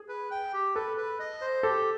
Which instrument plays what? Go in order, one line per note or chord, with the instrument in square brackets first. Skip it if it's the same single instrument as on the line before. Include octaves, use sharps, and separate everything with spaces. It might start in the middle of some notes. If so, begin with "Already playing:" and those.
Already playing: [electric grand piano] G#4
[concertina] B4
G5
G4
[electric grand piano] A4 [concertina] B4
[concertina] B4
D#5
C5
[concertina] G4 [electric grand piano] A4